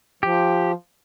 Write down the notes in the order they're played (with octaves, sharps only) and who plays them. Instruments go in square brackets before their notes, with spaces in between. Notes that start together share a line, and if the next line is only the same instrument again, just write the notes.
[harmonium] F3 [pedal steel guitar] G4